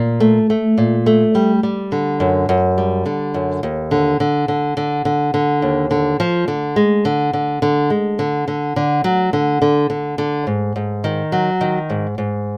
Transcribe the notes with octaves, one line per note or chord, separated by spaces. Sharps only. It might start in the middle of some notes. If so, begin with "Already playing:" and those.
Already playing: A#2
A3
A3
A#2
A3
G3
G3
D3
F#2
F#2
G3
D3
F#2
D#2
D3
D3
D3
D3
D3
D3
D#2
D3
F3
D3
G#3
D3
D3
D3
G#3
D3
D3
D3
F#3
D3
D3
D3
D3
G#2
G#2
D#3
F#3
D#3
G#2
G#2